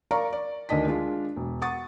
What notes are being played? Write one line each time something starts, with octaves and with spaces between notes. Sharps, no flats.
A#4 D5 F5 A#5 C#6
D5
D2 D#3 D5 D#5 A5 B6
G#3 D4 F4
E1
F#5 C#6 D#6 A6